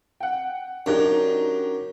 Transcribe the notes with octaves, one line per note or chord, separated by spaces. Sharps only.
F#5 G5
F#2 D4 D#4 G4